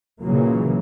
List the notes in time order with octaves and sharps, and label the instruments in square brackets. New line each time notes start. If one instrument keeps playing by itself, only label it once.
[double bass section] A#2 C#3 E3 F#3 A#3